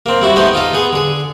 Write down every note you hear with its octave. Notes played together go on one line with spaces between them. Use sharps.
A#3 C4
G3 E4 F#4
A3 B3 D#4 G4 C5 D#5
D#4 F4 A4 D#5
B3 G#4
D3 G#4